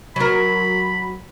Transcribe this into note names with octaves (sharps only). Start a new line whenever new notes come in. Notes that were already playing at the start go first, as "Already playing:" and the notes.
F#3 A#4 B5